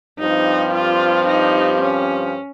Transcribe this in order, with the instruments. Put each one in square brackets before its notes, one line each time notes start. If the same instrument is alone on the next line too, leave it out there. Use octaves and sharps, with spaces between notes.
[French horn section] G2 F3 C4 G4 [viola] D#4
[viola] F4
D#4
C#4